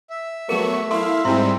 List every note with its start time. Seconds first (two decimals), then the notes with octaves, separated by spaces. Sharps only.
0.10 E5
0.49 F#3 A3 B3 G#4 A#4 C#6
0.91 E4 A4 F5 C6
1.25 G#2 G3 G#3 C4 E4 C6